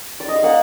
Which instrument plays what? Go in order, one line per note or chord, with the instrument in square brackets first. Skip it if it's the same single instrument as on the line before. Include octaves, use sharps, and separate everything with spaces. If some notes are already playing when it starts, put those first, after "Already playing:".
[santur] D5
D#5
F5
A#3 F#5